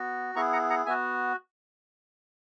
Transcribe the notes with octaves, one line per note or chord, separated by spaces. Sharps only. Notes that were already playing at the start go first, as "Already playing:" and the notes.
Already playing: B3 F#4
B3 E4 G#4 A#5 C#6
F#5 A#5
F#5 A#5
B3 F#4 E5 G#5